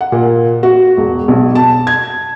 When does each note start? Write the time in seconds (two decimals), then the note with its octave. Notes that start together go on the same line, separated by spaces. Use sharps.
0.01 F#5
0.12 A#2
0.63 F#4
0.97 E1
1.28 B1
1.55 A5
1.87 G#6